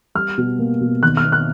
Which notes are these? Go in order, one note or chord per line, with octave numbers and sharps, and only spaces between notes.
G3 F6
B2
A#3
B2
D#3 F#6
F6
B3
F#6